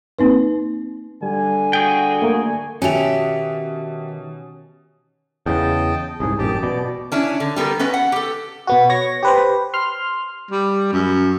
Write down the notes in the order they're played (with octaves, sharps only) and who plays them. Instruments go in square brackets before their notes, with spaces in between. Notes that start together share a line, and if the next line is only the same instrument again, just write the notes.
[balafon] A#3 C4 D#4 B4
[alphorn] D3 [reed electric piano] G3 [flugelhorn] G#5
[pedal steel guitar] F#4 G#4 G5
[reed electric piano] A3 A#3
[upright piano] B2 A5 F7 [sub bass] D#3 [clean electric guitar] C#4 [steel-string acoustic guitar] G4 E5
[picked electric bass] E2 C#3 [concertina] D#5 G5 A5
[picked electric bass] C2 G#2 [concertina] G#4
[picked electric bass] A1 F#2 [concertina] G4 G5 A5
[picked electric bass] B2 [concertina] D5
[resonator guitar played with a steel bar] C#4 D4 E4
D3
G3 B3 A4 A#4
B3 C#4 B4 D#5
F#5
G4 A4
[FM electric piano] B2 B3 F#4
C#5 C#6 A#6
G4 B4 C5
C6 F6
[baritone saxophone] G3
F#2